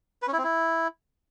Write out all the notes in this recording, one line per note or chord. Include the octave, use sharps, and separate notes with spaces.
B4
C#4
E4
C4
E4